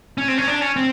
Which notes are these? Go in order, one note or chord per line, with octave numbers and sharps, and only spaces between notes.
C#4
C4
C#4
D4
C#4
C4